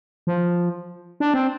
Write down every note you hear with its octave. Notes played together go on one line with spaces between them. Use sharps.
F3
D4
C4